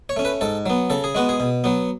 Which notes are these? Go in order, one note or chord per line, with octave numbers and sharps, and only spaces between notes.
C#5
A3 C#4
B4
G#2 A4
F#3 B3
C#3 A4
G#4
G#3 B3 F#4
G#4
B2
F#3 B3